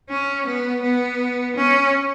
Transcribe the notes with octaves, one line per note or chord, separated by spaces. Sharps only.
C#4
B3
B3
C#4